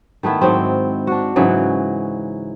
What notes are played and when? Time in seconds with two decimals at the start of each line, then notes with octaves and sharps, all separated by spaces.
0.23 D#3 A3 B3 E4
0.41 G#2 F#3 C4
1.07 D4 F#4
1.36 G#2 C#3 E3 F#3